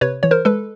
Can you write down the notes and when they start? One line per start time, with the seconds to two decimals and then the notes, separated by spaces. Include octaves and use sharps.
0.01 C3 B4 C#5
0.23 E3 C#5
0.31 A#4 C5
0.45 G#3 A4 B4